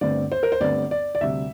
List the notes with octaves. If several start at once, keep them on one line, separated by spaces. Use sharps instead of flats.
G1 G2 D3 A3 C4 D5
C5
A#4
C5
G1 G2 D3 A3 C4 D5
D5
D5
D2 C3 G3 E5